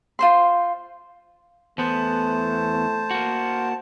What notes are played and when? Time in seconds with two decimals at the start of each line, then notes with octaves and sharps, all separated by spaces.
0.19 F4 C5 C6
1.78 E2 A3 B3 C5 A5
3.11 A#3 F#4